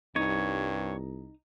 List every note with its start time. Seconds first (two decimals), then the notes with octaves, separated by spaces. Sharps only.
0.16 C2 G2 D#4 C#5